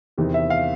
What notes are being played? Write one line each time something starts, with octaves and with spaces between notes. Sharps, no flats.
E2 C3 D#3
E5
F5